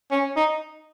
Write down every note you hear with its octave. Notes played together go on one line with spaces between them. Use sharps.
C#4
D#4